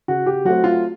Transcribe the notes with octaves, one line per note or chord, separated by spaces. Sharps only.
C#3 F#4
G4
F#3 A3 C4 F#4
F4